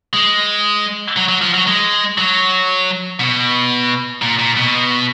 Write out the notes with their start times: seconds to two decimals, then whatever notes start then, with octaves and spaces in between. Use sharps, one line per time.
0.13 G#3
1.16 F#3
1.29 F#3
1.41 F3
1.54 F#3
1.67 G#3
2.18 F#3
3.20 B2
4.22 A#2
4.39 A#2
4.56 B2